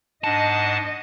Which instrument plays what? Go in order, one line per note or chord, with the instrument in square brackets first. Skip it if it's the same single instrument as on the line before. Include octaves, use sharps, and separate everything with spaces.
[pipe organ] G#2 D4 F#5 [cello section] D#5 [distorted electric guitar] A5